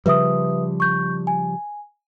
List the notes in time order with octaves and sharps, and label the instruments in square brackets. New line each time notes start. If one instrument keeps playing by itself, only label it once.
[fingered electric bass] C#3 F3 G3 [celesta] B4 E5 D#6
[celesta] C#6 G6
G#5